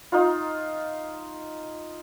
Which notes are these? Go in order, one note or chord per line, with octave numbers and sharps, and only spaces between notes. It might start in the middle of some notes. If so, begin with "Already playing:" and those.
D#4 F4